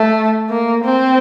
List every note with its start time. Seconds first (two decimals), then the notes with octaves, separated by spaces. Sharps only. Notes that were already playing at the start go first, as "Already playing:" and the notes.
Already playing: A3
0.50 A#3
0.84 C4